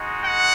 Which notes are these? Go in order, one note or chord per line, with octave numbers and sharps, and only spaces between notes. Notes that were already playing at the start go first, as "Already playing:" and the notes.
Already playing: G#3 D#4 F#4
F#5